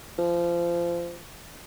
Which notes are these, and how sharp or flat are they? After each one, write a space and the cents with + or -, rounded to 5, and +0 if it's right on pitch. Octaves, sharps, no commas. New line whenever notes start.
F3 -25